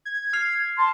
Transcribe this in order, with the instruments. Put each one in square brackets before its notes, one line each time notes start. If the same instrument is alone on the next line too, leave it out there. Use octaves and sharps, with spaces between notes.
[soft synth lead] G#6
[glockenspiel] F6 C7 F7
[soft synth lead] A5 [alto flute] C6